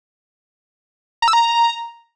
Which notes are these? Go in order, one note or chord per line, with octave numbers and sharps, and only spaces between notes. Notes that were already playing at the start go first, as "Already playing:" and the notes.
A#5
E6
A#5